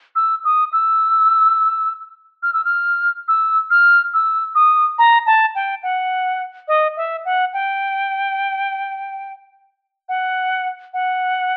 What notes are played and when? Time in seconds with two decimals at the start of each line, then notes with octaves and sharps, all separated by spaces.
0.16 E6
0.45 D#6
0.73 E6
2.43 F6
2.53 E6
2.65 F6
3.28 E6
3.71 F6
4.14 E6
4.55 D#6
4.98 A#5
5.26 A5
5.55 G5
5.83 F#5
6.68 D#5
6.97 E5
7.25 F#5
7.53 G5
10.09 F#5
10.94 F#5